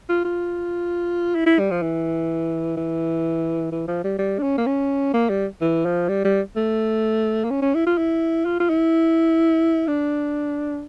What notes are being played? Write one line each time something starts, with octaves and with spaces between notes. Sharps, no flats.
F4
F4
E4
E4
G3
F3
E3
E3
E3
F3
G3
G3
D4
C#4
A#3
C#4
A#3
G3
E3
F3
G3
G3
A3
A#3
C#4
C#4
E4
F4
E4
F4
F4
E4
D4